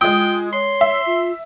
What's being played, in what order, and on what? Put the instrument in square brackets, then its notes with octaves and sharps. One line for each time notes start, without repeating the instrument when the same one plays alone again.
[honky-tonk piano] G#3 D#6 [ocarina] F4 [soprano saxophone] G5
[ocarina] C#5 [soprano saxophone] C6
[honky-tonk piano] E5
[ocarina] F4